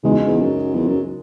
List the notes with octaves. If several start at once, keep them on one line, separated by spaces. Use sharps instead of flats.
E2 C#3 G#3 D#4 F#4
E2
F#2
E2
F#2